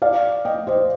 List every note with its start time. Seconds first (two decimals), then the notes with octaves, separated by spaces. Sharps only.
0.02 D5 F5
0.45 D#5 G5
0.67 C5 D#5